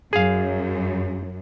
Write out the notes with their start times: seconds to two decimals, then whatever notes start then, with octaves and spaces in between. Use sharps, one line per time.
0.13 F#2 G#4 F5